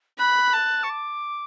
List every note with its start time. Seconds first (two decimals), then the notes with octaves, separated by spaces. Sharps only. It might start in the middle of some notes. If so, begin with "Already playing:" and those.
0.18 B5 F#6
0.53 A5
0.83 C#6
0.89 D6